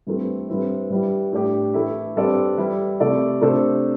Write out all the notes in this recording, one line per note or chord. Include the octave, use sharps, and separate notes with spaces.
G2 E3 A3 C4
G2 E3 C4 E4 C5
G2 G3 E4
A2 A3 D4 G4
E3 A3 E4
G2 G3 C4 A4 D5
E3 G3 E4
C3 A3 E4 A4 D5
C3 A3 D4 A4 C5